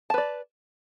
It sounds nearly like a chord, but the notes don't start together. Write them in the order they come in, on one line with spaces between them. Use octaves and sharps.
A5 B4 D5